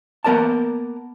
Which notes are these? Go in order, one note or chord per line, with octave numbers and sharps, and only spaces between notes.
A#3 B3 A#4 D5 A5